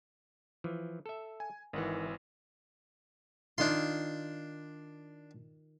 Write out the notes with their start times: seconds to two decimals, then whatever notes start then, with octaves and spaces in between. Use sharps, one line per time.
0.64 E3 F3
1.06 A4 E5
1.40 G#5
1.73 G#1 D#3 E3 F#5
3.58 D#3 D4 F4 C6